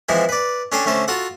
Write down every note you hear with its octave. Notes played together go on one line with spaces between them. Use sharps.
E3 F3 G#3 C4 E4
B4 D5
C#4 D4 A4 G5 G#5 C6
D3 A3 C#4 A4 C5
F4 F#4 A4 F#5